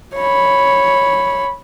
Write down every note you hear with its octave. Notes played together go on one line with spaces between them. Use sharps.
C#5 B5